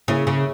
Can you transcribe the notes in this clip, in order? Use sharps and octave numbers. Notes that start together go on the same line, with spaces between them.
C#3 A#3 E4 G#4 C#5 E5
C#3